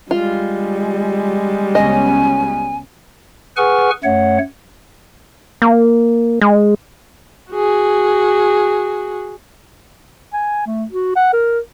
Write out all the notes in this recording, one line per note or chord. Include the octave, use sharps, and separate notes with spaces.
G3 G#3 F4
C#2 B3 C#4 D#5 G#5
G#4 B4 F#5 G#5 C#6 F6
F#2 A3 C#5 F#5
A#3
G#3
F#4 G#4
G#5
A3
F#4
F#5
A#4